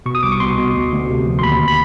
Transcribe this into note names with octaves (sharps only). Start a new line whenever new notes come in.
B2 C#6
D#6
C2 D6
C#6
B2 C6
B2
D2
D2
C3
F3
C6
D#2 B5
B5